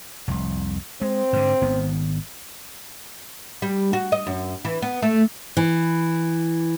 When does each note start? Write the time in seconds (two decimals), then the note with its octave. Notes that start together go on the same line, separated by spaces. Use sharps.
0.28 F1 C2
1.01 G#3 C4
1.33 G#2 D3
1.61 G#1 D#3 B3
3.62 G3
3.93 F#4
4.12 D#5
4.27 F#2
4.65 E3
4.82 B3
5.02 A3
5.57 E3